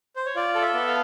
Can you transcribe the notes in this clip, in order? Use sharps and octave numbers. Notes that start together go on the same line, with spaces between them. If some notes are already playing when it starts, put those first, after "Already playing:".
C5
C#5
F4 D5
A4
E5
B3
F5